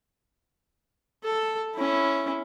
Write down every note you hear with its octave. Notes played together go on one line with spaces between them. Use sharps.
A4
C#4 E4